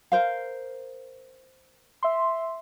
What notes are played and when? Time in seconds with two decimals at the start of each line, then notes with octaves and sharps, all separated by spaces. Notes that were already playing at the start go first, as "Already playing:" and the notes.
0.12 A#4 C5 F5
2.03 E5 C6